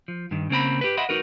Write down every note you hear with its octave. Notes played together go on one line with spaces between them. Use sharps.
F3
G2 D#3
C#3 A#3 C4 A#5 B5
G4 B4
D#5 E5 F#5 B5 C6
D#4 F#4 A#4 B4